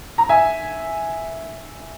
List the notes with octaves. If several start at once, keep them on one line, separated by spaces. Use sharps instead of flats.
A#5
E5 G#5